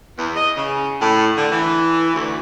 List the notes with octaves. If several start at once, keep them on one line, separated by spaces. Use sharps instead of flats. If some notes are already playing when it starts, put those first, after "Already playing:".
E2
D#5
C#3
A2
D3
E3
D2